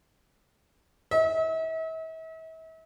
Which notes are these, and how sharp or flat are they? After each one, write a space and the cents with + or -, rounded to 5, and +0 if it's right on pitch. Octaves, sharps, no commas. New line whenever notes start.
E5 -40